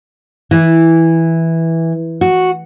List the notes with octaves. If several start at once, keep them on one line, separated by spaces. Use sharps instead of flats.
E3
F#4